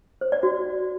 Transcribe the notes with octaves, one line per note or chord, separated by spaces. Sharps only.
C5
D5
F#4